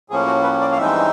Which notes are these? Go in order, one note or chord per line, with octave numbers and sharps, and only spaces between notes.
A2 F3 A#3 C#4 G#4
F#4
B4
D5
F5
G2 E3 G#3 C4 D#4 E5